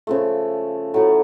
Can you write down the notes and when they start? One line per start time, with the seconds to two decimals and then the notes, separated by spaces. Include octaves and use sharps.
0.07 C#3 F3 A3
0.94 A2 F#3 A3